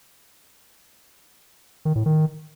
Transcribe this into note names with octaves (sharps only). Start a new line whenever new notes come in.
D#3
A2
D#3